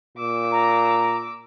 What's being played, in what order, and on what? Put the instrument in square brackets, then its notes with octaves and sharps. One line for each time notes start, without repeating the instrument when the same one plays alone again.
[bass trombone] A#2 [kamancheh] D6 E6
[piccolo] A#5